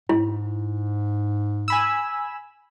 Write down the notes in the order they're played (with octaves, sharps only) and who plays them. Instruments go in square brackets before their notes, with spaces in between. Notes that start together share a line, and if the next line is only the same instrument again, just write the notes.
[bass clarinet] G#2 [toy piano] E4
[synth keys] G#5 B5 E6